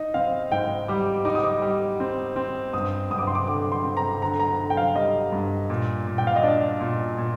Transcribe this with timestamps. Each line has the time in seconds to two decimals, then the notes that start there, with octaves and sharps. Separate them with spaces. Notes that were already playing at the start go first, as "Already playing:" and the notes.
Already playing: D#4 D#5
0.14 C4 F5
0.51 G#2 G5
0.88 G3 D6
1.25 D#4 D6
1.35 D#6
1.44 D6
1.62 G3
2.00 C4
2.36 C4
2.73 G2 D#6
3.10 G2 D#6
3.18 D6
3.27 C6
3.35 D6
3.47 D3 D6
3.72 C6
3.84 C4
3.97 A#5
4.22 D3 A#5
4.40 A#5
4.59 D3
4.70 G5
4.77 F5
4.96 G3 D#5
5.32 G2
5.70 A#2
6.07 A#2
6.18 G5
6.27 F5
6.36 D#5
6.43 D4 D5
6.81 A#2
7.18 A#2